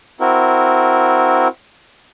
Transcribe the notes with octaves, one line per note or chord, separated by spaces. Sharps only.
C4 E4 F#4 A#4